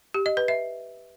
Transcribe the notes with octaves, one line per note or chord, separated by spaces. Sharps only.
G4
D#5
B4
E5